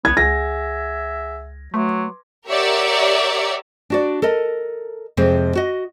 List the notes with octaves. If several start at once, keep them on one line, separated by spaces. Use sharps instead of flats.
C2 B3 G#6
C#2 G#4 E5 F#5 G#5 A#6
F#3 A3 B4 C6 D6
G4 A#4 C#5 D5 E5 F#5
D4 F#4 D5
A4 A#4 D#5
F2 C3 G#3 C4
F#4 D#5